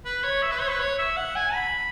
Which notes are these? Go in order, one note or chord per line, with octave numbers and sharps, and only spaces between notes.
B4
C#5
E5
B4
C#5
B4
C#5
E5
F#5
G#5
B5